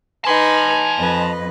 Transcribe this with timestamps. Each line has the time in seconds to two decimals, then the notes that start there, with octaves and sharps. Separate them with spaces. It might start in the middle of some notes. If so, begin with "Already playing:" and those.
0.25 D#4 B4 G#5 A5 C6
0.97 F2 B4 D#5